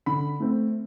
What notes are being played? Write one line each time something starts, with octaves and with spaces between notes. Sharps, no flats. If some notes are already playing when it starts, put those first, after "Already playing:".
D3 B5
A3 C4